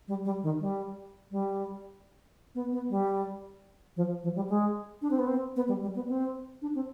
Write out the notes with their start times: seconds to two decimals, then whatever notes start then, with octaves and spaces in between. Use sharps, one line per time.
0.08 G3
0.25 G3
0.43 D#3
0.60 G3
1.31 G3
2.55 B3
2.72 B3
2.90 G3
3.96 F3
4.23 F3
4.36 G3
4.49 G#3
5.02 D4
5.11 C4
5.19 B3
5.28 C4
5.56 B3
5.68 G3
5.82 G3
5.95 B3
6.09 C4
6.62 D4
6.75 C4